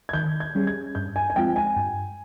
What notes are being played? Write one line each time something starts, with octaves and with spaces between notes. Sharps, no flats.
G#6
D#3 G6
G#6
G3 C#4 G#4
G#6
G2 G6
G#5
G#5
F3 G#3 C4 F4 G5
G#5
G2